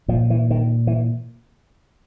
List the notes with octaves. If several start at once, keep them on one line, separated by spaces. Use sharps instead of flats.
A#2 F3
E3
D#3
E3